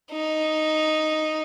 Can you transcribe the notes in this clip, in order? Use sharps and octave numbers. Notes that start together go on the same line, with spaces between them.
D#4